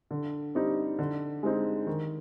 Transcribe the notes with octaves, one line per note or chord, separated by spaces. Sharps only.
D3
G3 C4 D#4
D3
G#3 C4 D#4
D#3